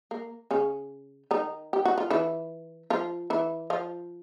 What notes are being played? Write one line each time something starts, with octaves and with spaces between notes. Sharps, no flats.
A#3
C#3 C#4
D#3 D#4
G4
F#4
F4
E3 E4
F3 F4
E3 E4
F3 F4